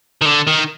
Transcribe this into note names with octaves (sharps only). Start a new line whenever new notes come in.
D#3
D3
D#3